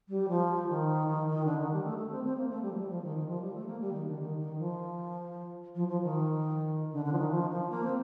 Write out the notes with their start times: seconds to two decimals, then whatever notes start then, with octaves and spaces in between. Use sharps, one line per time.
0.08 G3
0.29 F3
0.68 D#3
1.07 D#3
1.26 D#3
1.45 D3
1.58 D#3
1.72 G3
1.84 A3
1.97 A3
2.11 C4
2.24 C4
2.37 A#3
2.49 A3
2.62 G3
2.71 F3
2.75 G3
2.89 F3
3.01 D#3
3.15 D#3
3.27 F3
3.41 G3
3.54 A3
3.66 A#3
3.80 G3
3.92 D#3
4.06 D3
4.19 D#3
4.38 D#3
4.58 F3
5.75 F3
5.88 F3
6.01 D#3
6.92 D3
7.05 D3
7.12 F3
7.18 D#3
7.31 F3
7.50 F3
7.70 A#3
7.84 C4